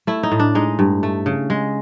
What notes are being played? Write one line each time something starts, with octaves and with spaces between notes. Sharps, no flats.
A3 E4
D#4
A2
D4
G#3 D#4
G2
A3
C#3
G#3